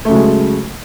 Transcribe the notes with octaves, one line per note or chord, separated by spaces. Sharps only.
C#3 F#3 G#3 A3